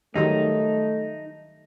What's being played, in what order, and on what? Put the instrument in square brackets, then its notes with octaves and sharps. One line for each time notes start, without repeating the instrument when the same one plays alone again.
[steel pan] D#3 F#3 G3 [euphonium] A3 [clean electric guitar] D#4